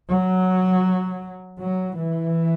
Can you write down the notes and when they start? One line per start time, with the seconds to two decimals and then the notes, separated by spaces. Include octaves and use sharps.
0.11 F#3
1.59 F#3
1.96 E3